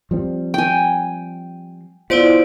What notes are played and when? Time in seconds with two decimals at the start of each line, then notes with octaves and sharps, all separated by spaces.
0.11 F3 G3 C4
0.54 G5 G#5
2.10 B3 E4 F4 C5 D5 D#5 D7